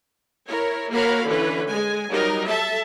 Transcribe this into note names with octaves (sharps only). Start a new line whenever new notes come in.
E4 A#4 C#5
A#3 F#4 A#4 C#5 F5 B5
D3 E3 C#4 B4
G#3 G#5
F#3 G3 D#4 A#4
A4 E5 A5